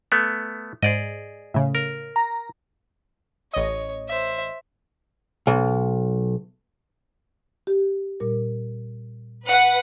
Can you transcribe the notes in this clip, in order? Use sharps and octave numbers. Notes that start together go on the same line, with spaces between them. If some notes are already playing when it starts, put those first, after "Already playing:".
A3 B3
G#2 G#4 D5 D#5
A2 C#3
A#4
A#5
A1 C#5 D#5
C5 E5
B1
G4
A#2 G3 A#4
B4 F#5